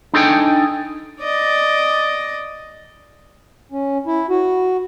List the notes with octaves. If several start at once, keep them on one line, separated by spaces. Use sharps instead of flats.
D4 D#4 A4 G5 G#5
D5 D#5
C#4
E4
F#4